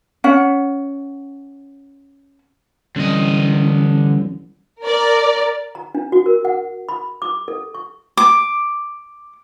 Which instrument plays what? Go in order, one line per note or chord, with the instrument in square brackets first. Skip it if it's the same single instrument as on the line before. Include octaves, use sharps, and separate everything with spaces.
[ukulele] C#4 F#5
[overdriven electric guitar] D3 D#5 [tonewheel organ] E3 G3 C#4
[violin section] A#4 D5
[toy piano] A#5
D4
F#4
A#4
F#5
B5
D6
A4
C#6
[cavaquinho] D6